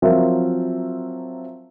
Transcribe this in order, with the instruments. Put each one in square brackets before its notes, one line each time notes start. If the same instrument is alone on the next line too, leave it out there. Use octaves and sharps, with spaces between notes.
[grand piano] F3 F#3 C4 F4 A#4 E5